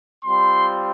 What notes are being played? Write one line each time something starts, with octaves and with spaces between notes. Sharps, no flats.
G3 C4 F4 C6